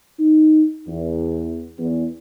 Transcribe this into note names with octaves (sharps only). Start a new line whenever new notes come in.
D#4
E2
E2